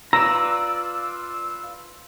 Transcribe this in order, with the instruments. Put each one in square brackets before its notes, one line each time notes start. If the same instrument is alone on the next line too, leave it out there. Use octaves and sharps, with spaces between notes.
[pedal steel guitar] F4 B4 D5 [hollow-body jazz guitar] A#5 [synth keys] E6